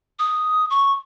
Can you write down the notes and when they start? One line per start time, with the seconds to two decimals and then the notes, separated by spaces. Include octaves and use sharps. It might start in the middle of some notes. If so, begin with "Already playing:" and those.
0.19 D#6
0.70 C#6